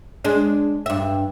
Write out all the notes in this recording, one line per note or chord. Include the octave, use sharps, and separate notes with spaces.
G#3 D4
G2 E5